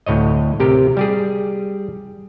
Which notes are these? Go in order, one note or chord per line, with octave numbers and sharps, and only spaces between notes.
D2 A2 C#5 D#5
C3 G4 A#4
G3 G4 G#4